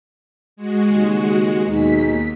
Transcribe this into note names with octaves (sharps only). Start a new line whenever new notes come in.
G#3 F#4
D#2 C#3
D#2 B2 D#4 G#4 B6